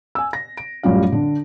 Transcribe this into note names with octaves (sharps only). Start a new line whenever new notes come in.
G#5 E6
A#6
D7
A1 F#2 G3 C#4 F4 F5
D3